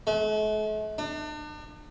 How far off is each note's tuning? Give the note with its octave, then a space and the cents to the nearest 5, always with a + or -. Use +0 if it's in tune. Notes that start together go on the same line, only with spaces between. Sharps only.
A3 -45
D4 +40